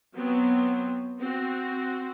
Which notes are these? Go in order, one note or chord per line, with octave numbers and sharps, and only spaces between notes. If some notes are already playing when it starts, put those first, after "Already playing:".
F#3 B3 C4
C4 F#4